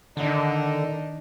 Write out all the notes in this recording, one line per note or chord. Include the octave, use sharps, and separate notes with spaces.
D3 D#3 D4 D#4